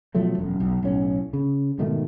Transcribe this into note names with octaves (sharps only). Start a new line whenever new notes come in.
B2 F3 F#3 A3
E1 F#2
B1
B1 A2 C#4
C#3
G#2 B2 D#3 A3